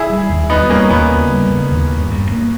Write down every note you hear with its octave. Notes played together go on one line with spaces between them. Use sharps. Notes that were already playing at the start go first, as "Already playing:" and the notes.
Already playing: E4 G#4
G3
D#2
G3 B3 D#4
G3 A#3 C#4
D#2 B3
C#3
G3
C#3
D#2
G2
G2
A#3